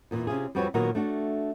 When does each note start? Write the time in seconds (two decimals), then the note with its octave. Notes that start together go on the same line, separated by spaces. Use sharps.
0.11 E2 A#2 E3
0.27 C3 C#4 F4 G#4
0.55 F2 G3 C4 F#4 B4 C#5
0.74 A#2 D#3 F#3 B3 F#4 A#4
0.95 A3 D4 F#4